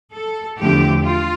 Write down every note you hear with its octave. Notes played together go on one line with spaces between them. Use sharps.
A4
E2 D3 F3 A3 G4
F4